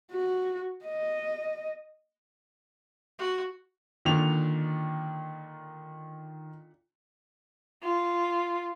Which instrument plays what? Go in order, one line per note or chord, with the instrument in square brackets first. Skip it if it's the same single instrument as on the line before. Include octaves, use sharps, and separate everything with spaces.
[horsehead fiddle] F#4
D#5
[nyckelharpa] F#4
[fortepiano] A#2 D3 D4 [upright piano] D#3 F7
[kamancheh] F4